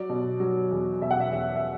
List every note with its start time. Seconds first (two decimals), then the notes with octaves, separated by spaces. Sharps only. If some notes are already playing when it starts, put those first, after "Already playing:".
Already playing: F#3 D5
0.09 B2
0.40 F#3
0.71 E2
1.01 B2 E5
1.11 F#5
1.20 E5
1.32 E2 E5
1.56 E5